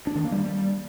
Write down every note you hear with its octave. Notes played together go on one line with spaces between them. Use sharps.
D4
D#3
A#3
G3